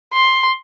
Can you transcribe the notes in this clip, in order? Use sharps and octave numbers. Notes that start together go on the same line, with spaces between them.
C6